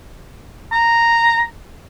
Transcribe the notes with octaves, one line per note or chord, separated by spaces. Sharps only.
A#5